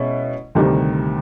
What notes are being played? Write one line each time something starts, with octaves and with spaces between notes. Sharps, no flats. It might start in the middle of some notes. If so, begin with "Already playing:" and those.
Already playing: B2 G#3 C#4 E4
D2 C3 D#3 G3